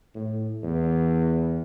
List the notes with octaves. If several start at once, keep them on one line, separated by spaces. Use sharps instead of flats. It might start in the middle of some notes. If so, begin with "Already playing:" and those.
A2
E2